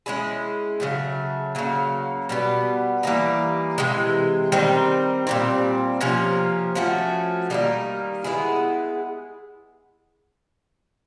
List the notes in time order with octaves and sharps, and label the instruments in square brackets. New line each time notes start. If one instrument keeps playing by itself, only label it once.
[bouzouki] G#3 C#4 E4 G#4
C#3 F#3 A3
C#3 F#3 A#3
B2 G3 B3
E3 G3 A#3 D#4
C3 E3 G#3
D#3 G3 C4 D#4
A#2 G3 C4
C3 F3 A#3 C#4
F3 A3 C#4 F#4
D#3 G3 A#3 D#4
G#3 B3 E4 G#4